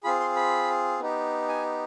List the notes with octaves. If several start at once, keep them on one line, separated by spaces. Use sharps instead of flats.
C4 F4 G#4 B5
C6
B5
B3 D#4 G4
G#5